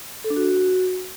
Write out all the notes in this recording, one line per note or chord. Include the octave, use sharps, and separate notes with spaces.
A4
D4
F#4